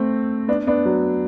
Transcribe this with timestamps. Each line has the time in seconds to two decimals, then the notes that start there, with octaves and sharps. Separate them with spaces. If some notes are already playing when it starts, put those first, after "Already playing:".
Already playing: A3 C4
0.48 B3 D4
0.67 B3 D4
0.85 F#3